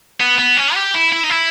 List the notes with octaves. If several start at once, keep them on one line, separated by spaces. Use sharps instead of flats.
B3
B3
C#4
G4
E4
E4
D#4
E4